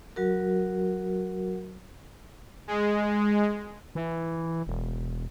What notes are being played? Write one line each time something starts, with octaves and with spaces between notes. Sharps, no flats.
F#3 F#4 A#4
G#3
E3
E1